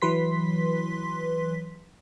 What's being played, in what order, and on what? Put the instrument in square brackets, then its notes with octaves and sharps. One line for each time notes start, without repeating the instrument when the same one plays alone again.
[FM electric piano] E3 F#3 B4 C6 B6